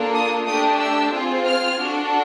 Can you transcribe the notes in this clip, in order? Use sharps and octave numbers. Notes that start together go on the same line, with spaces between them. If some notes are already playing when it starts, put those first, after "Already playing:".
Already playing: A#3 D4 F4 A4
D#6
A3 D4 G4 D#6
E6
C4 F4 G#4
F6
D4 F#4 A4